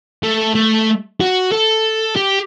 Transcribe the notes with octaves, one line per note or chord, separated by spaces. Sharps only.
A3
A3
F#4
A4
G4